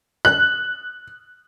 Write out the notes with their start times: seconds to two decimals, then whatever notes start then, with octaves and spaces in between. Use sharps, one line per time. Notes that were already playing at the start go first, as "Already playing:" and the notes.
0.25 F#6